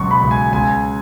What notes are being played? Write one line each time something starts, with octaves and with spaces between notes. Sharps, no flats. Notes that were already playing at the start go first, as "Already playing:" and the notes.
Already playing: C#2 B2 F#3 C#6
B5
C#2
G#5
C#2 G#5